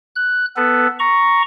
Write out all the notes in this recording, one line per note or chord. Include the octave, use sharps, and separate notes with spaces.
F#6
B3 A4 B4
A#5 C#6